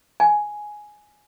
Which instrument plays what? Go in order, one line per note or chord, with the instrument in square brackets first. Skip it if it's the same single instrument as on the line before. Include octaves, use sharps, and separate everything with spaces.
[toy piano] G#5